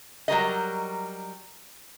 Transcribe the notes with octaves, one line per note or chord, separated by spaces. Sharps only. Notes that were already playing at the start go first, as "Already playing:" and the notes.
F#3 G3 A#4 D#5